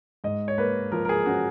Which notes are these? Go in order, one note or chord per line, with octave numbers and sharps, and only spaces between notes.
G#2 D#5
C#5
A#3 B4
F3 A#4
A#4
G#4
C#4 F#4